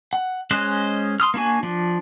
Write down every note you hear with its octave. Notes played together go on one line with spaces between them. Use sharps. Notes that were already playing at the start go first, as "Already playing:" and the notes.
F#5
G#3 C#4 C5 D#5 F#6
C6 D#6 F6
A#3 D4 F#4 G#5
F3 D4